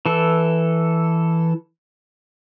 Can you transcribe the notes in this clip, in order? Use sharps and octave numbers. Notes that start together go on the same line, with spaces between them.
E3 A4